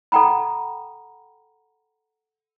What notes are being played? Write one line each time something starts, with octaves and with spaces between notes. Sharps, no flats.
A4 F#5 G5 A#5 B5